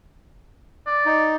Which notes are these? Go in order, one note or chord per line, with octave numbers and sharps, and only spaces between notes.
D5
D#4